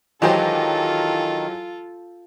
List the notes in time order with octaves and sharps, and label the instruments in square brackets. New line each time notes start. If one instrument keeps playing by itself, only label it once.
[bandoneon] D#3 [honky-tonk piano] E3 F#3 G4 [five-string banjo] G#3 C5 [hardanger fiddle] F4 A4